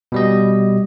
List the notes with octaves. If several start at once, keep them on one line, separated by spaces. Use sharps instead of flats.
B2 G3 D#5